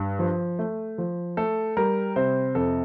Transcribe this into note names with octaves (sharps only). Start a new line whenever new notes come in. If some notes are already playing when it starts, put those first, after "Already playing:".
Already playing: G2
F3
A3
F3
A3 A4
G3 A#4
C3 C5
F2 A4